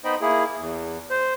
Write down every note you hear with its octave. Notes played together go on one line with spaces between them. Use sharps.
B3 D#4 C5 D#5 G5 B5
A#3 E4 G#4
E2
C5